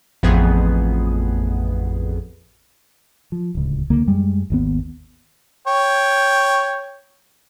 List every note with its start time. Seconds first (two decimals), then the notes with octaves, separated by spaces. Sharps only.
0.23 A1 F2 B3 G#4
3.32 F3
3.55 D1 C#2
3.90 C#2 D3 A#3
4.07 F#2 G3 G#3
4.50 G#1 D#2 B3
5.67 C#5 G5